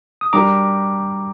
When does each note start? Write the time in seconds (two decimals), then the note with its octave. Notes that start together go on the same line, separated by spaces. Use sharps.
0.21 D#6
0.33 G3 D4 G4 A#4 A#5 D6